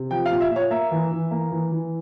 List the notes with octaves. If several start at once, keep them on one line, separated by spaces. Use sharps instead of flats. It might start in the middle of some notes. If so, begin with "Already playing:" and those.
Already playing: C3
F3 G5
F5
A#2
E5
A#2
C#5
A#3 E5
E3
E3
A#3
E3
E3